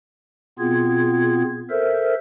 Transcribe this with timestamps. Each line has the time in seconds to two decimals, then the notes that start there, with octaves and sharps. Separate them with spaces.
0.59 B2 B3 C4 F4 G#4 G#6
1.70 A4 A#4 C5 E5